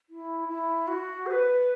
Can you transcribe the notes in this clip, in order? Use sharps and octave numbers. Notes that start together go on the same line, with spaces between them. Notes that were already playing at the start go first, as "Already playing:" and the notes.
E4
E4
F#4
C5
B4